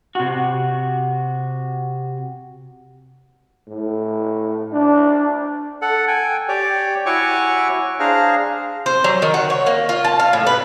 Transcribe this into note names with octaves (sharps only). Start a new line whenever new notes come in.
C3 F#4
A2
D4
A4 F#5
G5 G#5
G4 C#5 D5 G5
E4 F#4 C#5 G#5 C#6 D6
D4 G#4 C5 F5 A#5
C5
F#3
D#3
F#4
C#5
A#3
F4
A5
F5
A2
B4